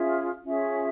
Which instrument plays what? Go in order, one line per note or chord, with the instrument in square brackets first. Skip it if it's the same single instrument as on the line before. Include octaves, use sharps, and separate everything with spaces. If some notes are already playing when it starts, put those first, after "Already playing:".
Already playing: [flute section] C#4 F4 G#4 E5
C#4 F4 G#4 E5